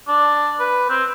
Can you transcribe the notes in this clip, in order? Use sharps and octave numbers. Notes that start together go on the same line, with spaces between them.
D4
B4
C4